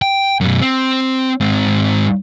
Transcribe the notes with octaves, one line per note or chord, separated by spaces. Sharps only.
G5
F#2 B2
C4
G#2 C4